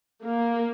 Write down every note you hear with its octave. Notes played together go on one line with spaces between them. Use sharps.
A#3